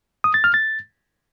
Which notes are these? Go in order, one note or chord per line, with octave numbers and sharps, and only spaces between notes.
D#6
A6
F6
A6